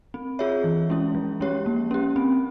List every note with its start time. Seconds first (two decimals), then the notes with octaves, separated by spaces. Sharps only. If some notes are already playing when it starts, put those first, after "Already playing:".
0.14 C4
0.39 F4 G#4 C#5 E5
0.64 E3
0.90 G#3 C#4 E4
1.15 F3
1.40 G#3 C#4 G4 C#5
1.66 A#3
1.91 C#4 G4
2.16 C4